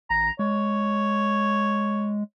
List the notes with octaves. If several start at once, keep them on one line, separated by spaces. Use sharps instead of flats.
A1 A#5
G#3 C#5